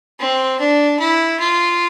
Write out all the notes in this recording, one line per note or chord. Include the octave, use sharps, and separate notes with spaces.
C4
D4
E4
F4